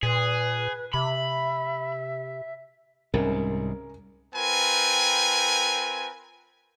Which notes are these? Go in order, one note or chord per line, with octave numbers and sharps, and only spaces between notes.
A#2 G#4 B4
C3 E5 B5
C2 G#2 C#4 A#4
C4 F4 A#4 B4 G5 G#5